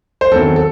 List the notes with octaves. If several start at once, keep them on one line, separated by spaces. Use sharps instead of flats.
C5
E2 D#3 F#3 C4 A4
A4